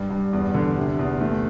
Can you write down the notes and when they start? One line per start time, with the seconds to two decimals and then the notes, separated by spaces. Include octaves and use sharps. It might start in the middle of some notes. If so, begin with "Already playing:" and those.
Already playing: G2
0.10 G2
0.33 E2
0.54 D3
0.77 C3
0.99 E2
1.21 A3